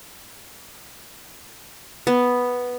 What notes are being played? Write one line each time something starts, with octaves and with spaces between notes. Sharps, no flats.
B3